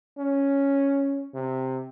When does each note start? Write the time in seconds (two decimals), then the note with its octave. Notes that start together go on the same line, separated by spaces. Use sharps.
0.18 C#4
1.34 C3